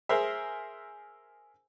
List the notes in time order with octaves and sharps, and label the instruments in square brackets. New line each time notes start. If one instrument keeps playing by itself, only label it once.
[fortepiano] G#4 A#4 C5 E5